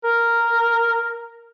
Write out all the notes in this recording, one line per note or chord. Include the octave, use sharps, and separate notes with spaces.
A#4